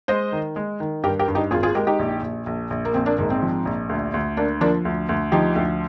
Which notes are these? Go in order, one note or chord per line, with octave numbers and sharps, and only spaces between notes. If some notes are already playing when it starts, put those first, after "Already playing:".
G#3 C5 D#5
D#3
G#3
D#3
G2 G4 A#4
G4 A#4
G2
D#4 G4
G#1 F4 G#4
F4 G#4
G#3 G4 A#4
D#4 G4
A#1
A#1
A#1
A#1
A#3
A#1 C4
A#3 D4
G#2 A#3
C4
F3
A#1
D2
D2
D3 A#3 D4
F3 A#3 D4
D2
D2
F3 D#4 G4
D2